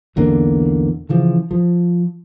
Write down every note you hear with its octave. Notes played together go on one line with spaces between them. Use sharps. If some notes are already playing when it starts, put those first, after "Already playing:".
B1 E2 D3 A#3
C#3 E3 F3
F3